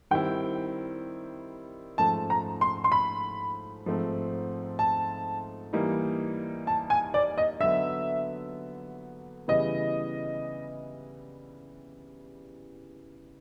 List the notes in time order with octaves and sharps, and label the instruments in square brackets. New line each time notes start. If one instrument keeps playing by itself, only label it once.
[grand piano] D#3 G3 C4 E4 [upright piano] G5
[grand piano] G#2 F3 A3 C#4 [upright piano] A5
[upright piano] A#5
C6
C6
B5
[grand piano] G#2 F3 A3 C4 D#4
[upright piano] A5
[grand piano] E3 G3 A#3 D#4
[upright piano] A5
G#5
D5
D#5
[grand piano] D3 F#3 B3 [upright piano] E5
[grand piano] C#3 E3 G3 B3 E4 [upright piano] D#5